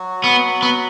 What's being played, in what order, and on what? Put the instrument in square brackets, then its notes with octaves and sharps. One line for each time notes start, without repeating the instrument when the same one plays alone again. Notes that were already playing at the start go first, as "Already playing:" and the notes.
Already playing: [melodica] F#3 F#4
[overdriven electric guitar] B3
B3